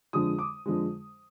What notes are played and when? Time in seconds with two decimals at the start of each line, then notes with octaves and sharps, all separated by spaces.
0.13 F2 D3 G#3 D#6
0.39 D6
0.66 F2 D3 G#3